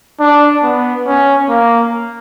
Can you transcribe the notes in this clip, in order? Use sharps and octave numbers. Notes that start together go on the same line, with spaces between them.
D4
B3
C#4
A#3